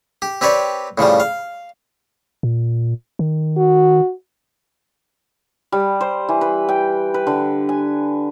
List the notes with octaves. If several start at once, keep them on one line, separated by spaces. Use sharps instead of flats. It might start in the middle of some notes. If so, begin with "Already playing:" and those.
G4
C4 G4 B4 C#5 D5
A2 C#3 F3 G3
F5
A#2
D#3
F#4
G3
C5
E3
B4
G5
B4
D3
G#5